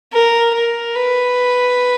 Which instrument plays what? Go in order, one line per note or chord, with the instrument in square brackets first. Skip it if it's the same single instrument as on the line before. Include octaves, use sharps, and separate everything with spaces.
[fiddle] A#4
A#4
B4